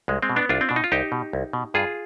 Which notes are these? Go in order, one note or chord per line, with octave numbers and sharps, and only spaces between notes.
C2 G#3
G#3 C4
B2
B3 D4
C2 D4 F4
C4
B2 D4
D#4
F4
C2 D#4 G4
B2
C2
B2
G2 F4 G#4